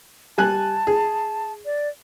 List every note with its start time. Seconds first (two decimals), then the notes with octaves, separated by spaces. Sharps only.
0.38 G3 G#5 A5 F#6
0.87 G#4
1.65 D5